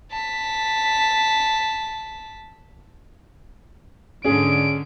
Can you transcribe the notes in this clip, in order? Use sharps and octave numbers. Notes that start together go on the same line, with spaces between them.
A5 B6
G#2 D3 C#4 G#4 D7